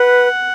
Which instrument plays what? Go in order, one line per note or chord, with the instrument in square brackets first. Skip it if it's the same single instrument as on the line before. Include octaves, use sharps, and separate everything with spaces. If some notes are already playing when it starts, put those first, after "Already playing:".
Already playing: [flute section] B4 [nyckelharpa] F#5